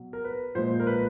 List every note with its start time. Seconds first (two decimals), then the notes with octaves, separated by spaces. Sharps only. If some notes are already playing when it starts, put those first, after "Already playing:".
Already playing: B2 F#3
0.13 A#4
0.24 B4
0.55 A#2 F3 G#3 C5
0.80 A#4
0.87 B4